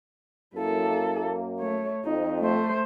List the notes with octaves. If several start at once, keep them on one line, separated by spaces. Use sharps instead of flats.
F#2 A#3 E4 A4
A3 C#5
F2 D#4
A3 C5